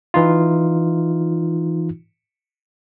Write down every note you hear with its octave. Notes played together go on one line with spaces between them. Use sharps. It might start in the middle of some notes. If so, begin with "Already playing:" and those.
E3 D#4 F4